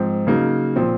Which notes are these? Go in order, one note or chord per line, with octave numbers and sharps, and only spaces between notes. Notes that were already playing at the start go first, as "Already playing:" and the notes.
Already playing: G#2 F3 C4
C#3 F#3 A#3 D#4
A#2 F3 C4